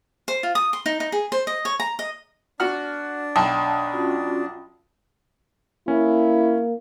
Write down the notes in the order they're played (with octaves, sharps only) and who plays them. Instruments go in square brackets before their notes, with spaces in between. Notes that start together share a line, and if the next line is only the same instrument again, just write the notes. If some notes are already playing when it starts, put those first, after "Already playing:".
[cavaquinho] C5
F4
D#6
C6
D#4
D#4
G#4
C5
D#5
C#5
A#5
D#5
[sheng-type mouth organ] D4 [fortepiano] F#4 F#5 F6
[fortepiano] B1 [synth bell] G5 A5 B5
[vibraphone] C#4 F4 F#4
[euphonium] A#3 [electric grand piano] C#4 [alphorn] E4